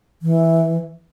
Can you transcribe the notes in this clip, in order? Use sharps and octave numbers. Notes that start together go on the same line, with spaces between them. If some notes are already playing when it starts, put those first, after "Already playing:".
E3